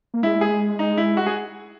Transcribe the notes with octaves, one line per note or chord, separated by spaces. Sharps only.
A#3
G#3 E4
G#4
D#4
E4
F#4
G#4